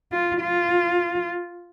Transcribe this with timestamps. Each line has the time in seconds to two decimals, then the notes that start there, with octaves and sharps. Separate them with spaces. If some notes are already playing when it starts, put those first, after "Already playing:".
0.12 F4
0.41 F4